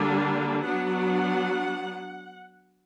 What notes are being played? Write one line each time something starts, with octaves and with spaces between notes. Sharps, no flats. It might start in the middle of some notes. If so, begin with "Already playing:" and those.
Already playing: D3 G3 A#3 D4
F#3 B3 D4 F#5